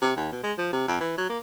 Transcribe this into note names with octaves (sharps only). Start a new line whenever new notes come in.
C3
D#2
B2
G#3
F3
C3
F2
E3
F#3
A#3